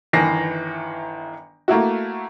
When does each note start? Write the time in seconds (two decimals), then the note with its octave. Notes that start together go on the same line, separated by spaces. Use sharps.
0.13 G1 D#3 E3 A#6 C7
1.68 A3 A#3 E4 F#4